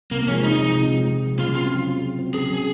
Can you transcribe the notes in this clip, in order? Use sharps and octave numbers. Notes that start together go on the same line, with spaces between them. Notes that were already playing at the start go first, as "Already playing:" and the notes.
C3 A#3
F3 G#3 C#4
C3 D#4
F3 G#3
C3
F3 G#3
C3
F3 G#3
C#3 F4
F#3 C4 F4
C#3
F#3 C4
C#3
F#3 C4
C#3 G#4
F#3 C4